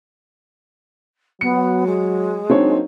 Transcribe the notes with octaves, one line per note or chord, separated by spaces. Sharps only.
F#3 B3 C#7
G#3
F#3 A#3 C4 D4 D#4 C#5